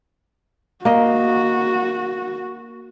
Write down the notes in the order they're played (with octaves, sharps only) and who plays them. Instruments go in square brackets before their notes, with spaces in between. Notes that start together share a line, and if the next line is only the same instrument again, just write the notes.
[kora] A#3 D#5 [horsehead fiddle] F#4